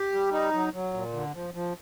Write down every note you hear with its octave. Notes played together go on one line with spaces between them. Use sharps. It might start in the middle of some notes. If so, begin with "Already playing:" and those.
Already playing: G4
G3
D#4
F#3
F#3
A#2
D3
F3
F3